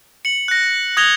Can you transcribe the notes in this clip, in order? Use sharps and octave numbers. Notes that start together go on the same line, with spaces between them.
C#7 F#7
F#6 A#6
D#6 F#6 G#6 A#6 F7 G7